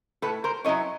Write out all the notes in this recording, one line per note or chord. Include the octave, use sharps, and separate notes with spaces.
A2 A4 B4
A#4 C5
F#3 A#3 C#4 E4 C#5 D#5